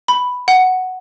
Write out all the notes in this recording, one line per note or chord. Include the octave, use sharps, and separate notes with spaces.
B5
F#5